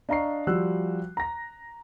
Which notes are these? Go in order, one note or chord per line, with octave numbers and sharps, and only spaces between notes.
D4 D#5 F5 A#5 C#6 C7
F3 G3 F#4 E6 F#6
A#5 A#6